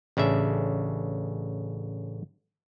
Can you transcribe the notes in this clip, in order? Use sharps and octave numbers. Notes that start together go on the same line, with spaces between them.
A1 C#3 D4 E5